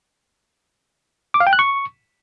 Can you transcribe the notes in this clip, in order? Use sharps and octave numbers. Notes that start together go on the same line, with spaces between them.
D6
F5
G5
F#6
C#6